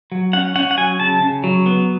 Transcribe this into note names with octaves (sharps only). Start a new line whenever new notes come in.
F#3
C#4 F#5
C#4 F#5
F#5
F#3 G#5
C#3 A5
C#3
F#3
B3